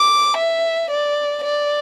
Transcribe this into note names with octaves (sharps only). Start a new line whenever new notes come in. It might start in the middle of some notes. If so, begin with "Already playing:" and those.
Already playing: D6
E5
D5
D5